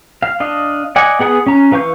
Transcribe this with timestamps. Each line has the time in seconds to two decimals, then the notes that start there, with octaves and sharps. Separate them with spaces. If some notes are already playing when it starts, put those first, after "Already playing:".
0.22 F5
0.40 D4 D#5 F5
0.96 D5 D#5 F#5 G#5
1.19 B3 G#4 F#5 G#5 D#6
1.46 C#4 A#5
1.71 E3 B4 F5 C#6 G6